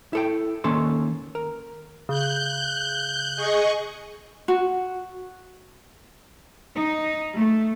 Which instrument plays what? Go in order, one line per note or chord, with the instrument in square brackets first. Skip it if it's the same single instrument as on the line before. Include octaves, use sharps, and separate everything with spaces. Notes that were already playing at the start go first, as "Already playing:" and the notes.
[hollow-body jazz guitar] E4 A4 G5
D#3 A#3 C#4 A4 C6
A#4
[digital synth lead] C#3 [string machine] F#6 G6
[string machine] G#4 D#5 C#6
[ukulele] F#4
[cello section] D#4
A3